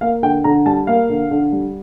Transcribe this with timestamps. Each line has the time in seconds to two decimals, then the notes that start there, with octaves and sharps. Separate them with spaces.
0.01 A#3 F5
0.23 D3 G5
0.44 D3 A#5
0.66 G3 A5
0.87 A#3 F5
1.09 D3
1.31 D3
1.52 G3